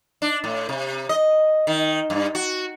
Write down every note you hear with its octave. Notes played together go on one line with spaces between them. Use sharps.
D4
A2
C3
D#5
D#3
G2
F#4